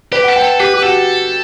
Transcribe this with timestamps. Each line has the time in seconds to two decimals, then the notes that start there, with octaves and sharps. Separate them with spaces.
0.12 G4 B4
0.24 A4 F#5
0.36 G5
0.44 A4
0.59 G4 B4
0.74 G4
0.82 F#4 A4